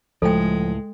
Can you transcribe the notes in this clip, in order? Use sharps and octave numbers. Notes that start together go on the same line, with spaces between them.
C#2 A2 F3 G#3 A4 G5